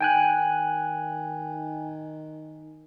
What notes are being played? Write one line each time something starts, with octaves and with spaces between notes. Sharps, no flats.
D#3 G5 G#5 F#6